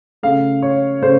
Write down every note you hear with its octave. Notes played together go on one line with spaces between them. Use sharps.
C#3 A3 F5
C#5
C#3 A3 C5